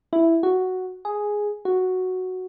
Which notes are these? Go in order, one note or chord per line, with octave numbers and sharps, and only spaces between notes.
E4
F#4
G#4
F#4